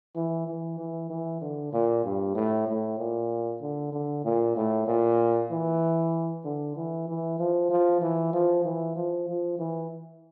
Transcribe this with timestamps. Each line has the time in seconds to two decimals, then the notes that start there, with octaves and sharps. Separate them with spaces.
0.16 E3
0.47 E3
0.79 E3
1.10 E3
1.41 D3
1.73 A#2
2.04 G2
2.35 A2
2.67 A2
2.98 A#2
3.61 D3
3.92 D3
4.24 A#2
4.56 A2
4.87 A#2
5.51 E3
6.45 D3
6.76 E3
7.08 E3
7.39 F3
7.70 F3
8.01 E3
8.33 F3
8.64 E3
8.96 F3
9.28 F3
9.59 E3